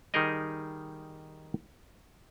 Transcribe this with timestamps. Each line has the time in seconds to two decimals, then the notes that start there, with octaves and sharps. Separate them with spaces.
0.14 D#3 G3 D#4 G#4 A#4 D#5